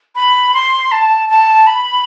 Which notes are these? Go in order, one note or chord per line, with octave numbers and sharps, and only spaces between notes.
B5
C6
A5
A5
B5